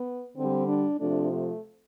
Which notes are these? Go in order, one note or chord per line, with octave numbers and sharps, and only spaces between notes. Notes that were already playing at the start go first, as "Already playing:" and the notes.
Already playing: B3
D3 G3 C4
D4
C3 F3 A3 D4
A3